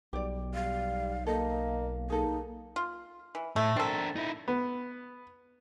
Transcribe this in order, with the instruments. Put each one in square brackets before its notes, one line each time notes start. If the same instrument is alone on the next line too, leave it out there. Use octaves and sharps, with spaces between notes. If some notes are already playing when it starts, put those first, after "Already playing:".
[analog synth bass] B1 [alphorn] G3 [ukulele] G4 D5
[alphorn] G3 [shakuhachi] F5
[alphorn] A#3 [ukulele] A4 [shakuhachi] D#5
[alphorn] A#3 [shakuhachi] D#4 [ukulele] G#4 A4
[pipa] F4
E3
[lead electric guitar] A2 [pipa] A3
[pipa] C4 A4 [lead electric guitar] D4 A#4
[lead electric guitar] D#4 E4
[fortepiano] B3